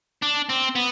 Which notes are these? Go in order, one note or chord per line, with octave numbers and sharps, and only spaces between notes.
D4
C4
B3